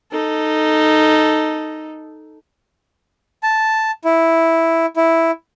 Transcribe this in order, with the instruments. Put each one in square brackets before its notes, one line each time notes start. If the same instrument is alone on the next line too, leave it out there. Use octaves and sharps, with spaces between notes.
[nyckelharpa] D#4 A4
[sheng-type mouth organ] A5
E4
E4